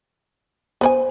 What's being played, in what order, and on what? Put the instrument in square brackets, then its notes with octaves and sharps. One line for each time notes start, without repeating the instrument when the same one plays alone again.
[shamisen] B3 B4 G#5 [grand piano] C5